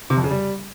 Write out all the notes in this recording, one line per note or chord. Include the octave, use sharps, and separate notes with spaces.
C3
F2
C#3
G3